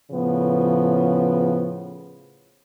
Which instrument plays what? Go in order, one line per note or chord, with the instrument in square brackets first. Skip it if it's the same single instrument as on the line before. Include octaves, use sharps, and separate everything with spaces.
[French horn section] A2 C#3 F3 B3